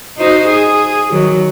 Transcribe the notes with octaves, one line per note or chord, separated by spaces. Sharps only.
D#4 F#4 C5
G#4
D#3 F#3